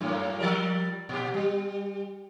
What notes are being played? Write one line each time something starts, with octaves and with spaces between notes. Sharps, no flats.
F#2 A2 A#3
F3 G3 A#4
A#2 G4
G3